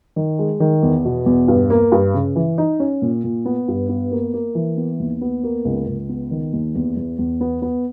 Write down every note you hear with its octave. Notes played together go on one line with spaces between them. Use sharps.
D#3
G#3
D#3
E2
B2
E2
G2
A#3
G2
C#3
E3
D#4
C#4
A#2
A#2
B3
G2
B3
A#3
A#3
E3
B3
D#2
B3
A#3
C#2
C#2
B3
D#3
D#2
E2
E2
E2
B3
B3